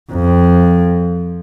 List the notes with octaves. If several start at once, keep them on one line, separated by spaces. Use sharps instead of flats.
F2